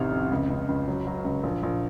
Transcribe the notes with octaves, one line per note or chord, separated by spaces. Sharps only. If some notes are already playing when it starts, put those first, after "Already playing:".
Already playing: A1 C3 D#3 F6
F2
C#2
C#2
C#2
F#3
F#3
C#2
A#1
A#1